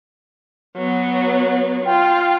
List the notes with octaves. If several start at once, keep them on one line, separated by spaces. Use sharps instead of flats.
F#3 B3
F4 G5